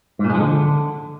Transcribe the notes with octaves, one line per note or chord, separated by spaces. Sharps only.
G#2
A#2
G#3
F3
D3